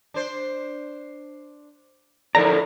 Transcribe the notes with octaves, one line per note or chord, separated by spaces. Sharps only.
D4 C5
A2 F3 E4 A4 A#4 D5 A#5 A#6